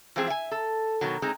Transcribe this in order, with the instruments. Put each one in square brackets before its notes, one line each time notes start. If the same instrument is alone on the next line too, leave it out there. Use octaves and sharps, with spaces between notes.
[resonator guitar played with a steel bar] E3 F3 G#3 C4 G#4
E5 G#5
A4
B2 D#3 F#3
G#3 C4 D#4